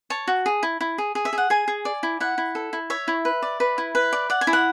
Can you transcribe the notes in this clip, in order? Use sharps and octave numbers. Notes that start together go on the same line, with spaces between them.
C#5 A5
F#4
G#4
E4
E4
G#4
G#4
E5
G#4
F#5
G#4 G#5
G#4
D5
E4
E4 F#5
E4
A4
E4
C#5 E5
E4
B4
D5
B4
E4
B4
D5
D5 F#5
G#5
E4
F#5